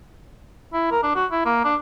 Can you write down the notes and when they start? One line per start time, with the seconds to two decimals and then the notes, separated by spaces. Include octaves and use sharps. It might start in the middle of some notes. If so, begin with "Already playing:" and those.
0.73 E4
0.91 A#4
1.03 D4
1.15 F#4
1.32 E4
1.45 A#3
1.64 D4